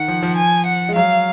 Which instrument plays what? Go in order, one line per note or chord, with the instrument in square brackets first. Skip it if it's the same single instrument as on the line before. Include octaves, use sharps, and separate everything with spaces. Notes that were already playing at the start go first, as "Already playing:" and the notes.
Already playing: [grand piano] D#3 [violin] F#5
[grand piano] F3
F3
[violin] G#5
F#5
[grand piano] G#3
[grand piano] F#3 [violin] F5